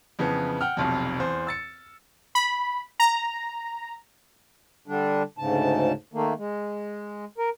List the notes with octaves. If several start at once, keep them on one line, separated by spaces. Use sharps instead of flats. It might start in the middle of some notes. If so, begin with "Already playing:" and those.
F2 C#3 E3 B3
F#5 G5 F6
F1 B1 F2
E2 C5
E6 A6 C#7
B5
A#5
D3 G3 D4
D2 G#2 C#3 A5
D#3 A3 A#3
G#3
A#4